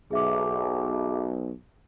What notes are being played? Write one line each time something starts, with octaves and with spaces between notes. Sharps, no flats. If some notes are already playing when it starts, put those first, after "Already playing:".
B1 G#4 E5 D6